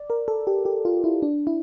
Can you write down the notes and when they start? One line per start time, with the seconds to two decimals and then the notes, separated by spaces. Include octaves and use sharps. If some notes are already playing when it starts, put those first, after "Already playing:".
Already playing: D5
0.10 A#4
0.28 A4
0.47 G4
0.65 G4
0.85 F4
1.04 E4
1.22 D4
1.47 E4